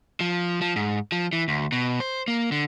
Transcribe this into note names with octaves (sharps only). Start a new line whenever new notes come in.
F3
F3
G#2
F3
E3
D2
B2
C5
A#3
D3